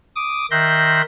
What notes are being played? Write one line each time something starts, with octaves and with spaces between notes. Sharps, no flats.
D6 D#6
D#3 E5 C6 F#6 G6 A#6